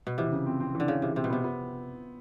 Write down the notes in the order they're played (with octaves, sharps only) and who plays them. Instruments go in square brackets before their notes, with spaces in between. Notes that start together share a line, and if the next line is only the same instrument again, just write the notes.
[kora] B2
[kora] C3 [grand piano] E3
[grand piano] C#3
C4
C4
E3
[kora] D3
[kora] C#3 [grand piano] E3
[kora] C3 [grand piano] E3
[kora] C3 [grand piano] C4
[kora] B2
[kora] C3 [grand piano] B3
[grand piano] B3